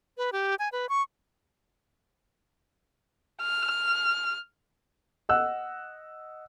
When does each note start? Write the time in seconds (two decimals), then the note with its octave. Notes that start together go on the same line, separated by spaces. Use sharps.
0.18 B4
0.32 G4
0.59 G#5
0.72 B4
0.89 C#6
3.41 F6
5.29 D#5 F#5 E6 F#6